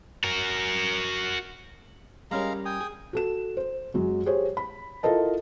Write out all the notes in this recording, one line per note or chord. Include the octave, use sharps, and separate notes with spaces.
F#4 A#4
G3 G#3 C#4 A#4 F5 A#5
G5 G#5 D#6
G#4
F#4 A4 E7
C5
F#2 F#3 G#3
G4 G#4 C5 C#5
B5
E4 F4 A4 A#4 D#5 A5